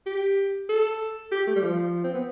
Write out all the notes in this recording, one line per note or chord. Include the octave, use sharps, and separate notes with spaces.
G4
A4
G4
A3
G3
F3
C4
B3